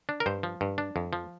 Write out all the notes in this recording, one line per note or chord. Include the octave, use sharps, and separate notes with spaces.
D4
A#4
G2 C5
F3
G2
D4
F2
F3